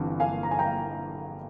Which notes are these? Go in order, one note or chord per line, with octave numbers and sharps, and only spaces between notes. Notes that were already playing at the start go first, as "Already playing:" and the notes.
Already playing: G1 G2 E3 C4
F5 G#5
A#5
G#5
G5 A#5